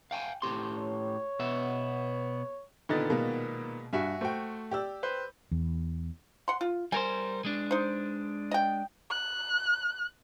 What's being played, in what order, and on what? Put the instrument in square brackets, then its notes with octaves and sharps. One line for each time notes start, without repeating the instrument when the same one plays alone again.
[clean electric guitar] F5 G5 G#5
A2 G4 C6
[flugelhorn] C#5
[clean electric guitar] B2 B3 E5
[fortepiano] A#2 D#3 B3 [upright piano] D3 D#5 A6
[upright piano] B2 G#3 A#3
[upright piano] G2 [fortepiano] F#4 E5 G#5
[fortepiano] A3 F#4 [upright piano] C5 G5
[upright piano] G4 D5 E6
[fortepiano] B4 C5
[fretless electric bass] E2
[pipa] F#5 C6
F4
[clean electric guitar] G3 A#4 C5 [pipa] G#5
[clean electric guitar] G#3 D4
[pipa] D#4 C5
D#5 G5
[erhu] F#6